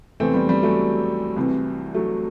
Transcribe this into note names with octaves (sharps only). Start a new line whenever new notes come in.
E2 C3 E3 A3 C4
G3 B3
G3
F#3 A3
C2 C3 E3
F#3 A3